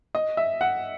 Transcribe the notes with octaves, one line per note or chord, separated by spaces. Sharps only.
D#5
E5
F#5